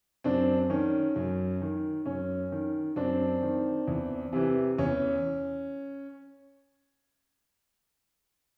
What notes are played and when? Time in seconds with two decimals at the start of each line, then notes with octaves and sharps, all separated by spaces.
0.24 F#2 C4 D4
0.70 D#3 C#4
1.16 F#2
1.61 D#3
2.06 F#2 C#4
2.52 D#3
2.96 F#2 C4 D4
3.42 D#3
3.87 E2
4.33 C3 E3
4.78 E2 C#4